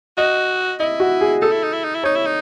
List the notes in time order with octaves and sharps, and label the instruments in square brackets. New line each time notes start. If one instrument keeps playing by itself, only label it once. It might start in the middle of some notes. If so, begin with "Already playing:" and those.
[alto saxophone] F#4 [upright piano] D#5
[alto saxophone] E4 [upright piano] D#5
[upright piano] F#4
G#4
[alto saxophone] D#4 [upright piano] A4
[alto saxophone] E4
D#4
E4
D#4
E4
[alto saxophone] D#4 [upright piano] C#5
[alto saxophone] E4
D#4